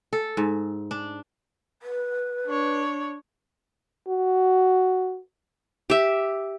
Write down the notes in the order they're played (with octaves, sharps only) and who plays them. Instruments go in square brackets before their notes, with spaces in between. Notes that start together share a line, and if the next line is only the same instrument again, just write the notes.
[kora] A4
G#2
D4
[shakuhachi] B4
[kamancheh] D4 C#5
[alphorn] F#4
[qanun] G4 E5